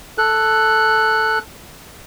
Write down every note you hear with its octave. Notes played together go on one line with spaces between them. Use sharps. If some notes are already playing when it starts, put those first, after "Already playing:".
A4 F#6